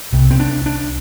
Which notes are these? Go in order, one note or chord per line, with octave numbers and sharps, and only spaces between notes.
C2 C3
C4
D4
D4